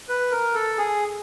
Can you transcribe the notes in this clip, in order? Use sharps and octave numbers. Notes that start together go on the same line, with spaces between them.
B4
A#4
A4
G#4